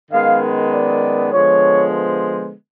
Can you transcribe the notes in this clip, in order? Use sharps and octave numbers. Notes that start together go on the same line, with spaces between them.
F#2 D#3 G#3 B3 F5
D5
D3 F3 G#3 B3 C#5
C5